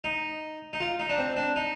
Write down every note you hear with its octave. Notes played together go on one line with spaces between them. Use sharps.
D#4
D#4
F4
D#4
D4
C4
D4
D#4